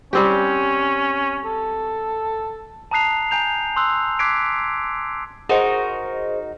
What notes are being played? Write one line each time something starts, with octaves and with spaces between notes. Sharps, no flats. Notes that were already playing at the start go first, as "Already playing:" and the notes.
G3 C4 C#4 G4
A4
A5 A#5 D#6 F#6 C7 F7
G#5 A#5 G6 F7
C6 D#6 E6 F#6
D6 F#6 G#6 B6 C7 D7
D#4 F#4 G#4 A#4 C5 D#5